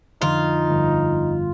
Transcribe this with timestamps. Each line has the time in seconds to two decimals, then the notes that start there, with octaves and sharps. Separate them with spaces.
0.22 F2 D3 F3 D#4 F4
0.70 G1